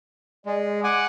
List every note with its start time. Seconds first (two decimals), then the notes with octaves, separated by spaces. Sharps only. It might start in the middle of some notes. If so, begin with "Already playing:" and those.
0.46 G#3 D5
0.84 F#5 G#5 D6